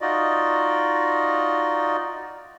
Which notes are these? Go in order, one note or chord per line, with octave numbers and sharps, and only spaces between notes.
D#4 F4 F#4 D5 D#5